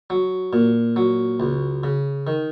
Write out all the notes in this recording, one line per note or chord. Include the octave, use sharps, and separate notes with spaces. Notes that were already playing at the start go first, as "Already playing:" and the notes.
F#3
A#2
F#3
C#2
C#3
D#3